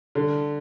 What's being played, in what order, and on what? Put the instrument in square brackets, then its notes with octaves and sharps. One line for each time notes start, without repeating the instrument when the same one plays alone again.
[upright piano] D3